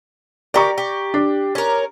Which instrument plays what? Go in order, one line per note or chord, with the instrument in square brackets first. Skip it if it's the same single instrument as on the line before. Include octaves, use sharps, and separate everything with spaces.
[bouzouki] G4 A#4 [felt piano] D5 A#5 C#6
[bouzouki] G4
[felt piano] D4
[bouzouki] C#4 A#4